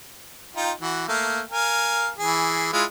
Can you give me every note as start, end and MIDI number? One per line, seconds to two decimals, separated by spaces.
0.56 0.71 63
0.56 0.71 65
0.56 0.71 79
0.81 1.04 52
0.81 1.04 66
1.08 1.41 57
1.08 1.41 58
1.08 1.41 77
1.51 2.10 70
1.51 2.10 77
1.51 2.10 80
2.18 2.69 52
2.18 2.69 68
2.73 2.84 56
2.73 2.84 64
2.73 2.84 65